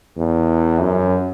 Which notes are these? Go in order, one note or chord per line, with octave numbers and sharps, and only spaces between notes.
E2
F#2